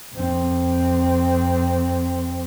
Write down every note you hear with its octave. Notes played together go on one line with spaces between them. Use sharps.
F2 C4